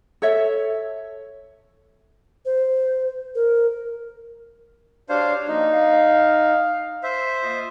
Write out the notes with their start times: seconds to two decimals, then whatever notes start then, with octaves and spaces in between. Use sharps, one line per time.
0.22 A4 C#5 E5
2.45 C5
3.35 A#4
5.09 D4 F#4 G4 C5 C#5 F5
5.48 F3 A#3 D#4
5.73 F5
7.03 C5 E5
7.43 A#3 F4 D#5